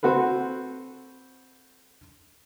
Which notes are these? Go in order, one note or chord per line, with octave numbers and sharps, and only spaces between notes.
C4 F#4 A4 B4